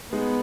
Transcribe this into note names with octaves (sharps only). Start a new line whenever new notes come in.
G#3 B3 D#4 G#4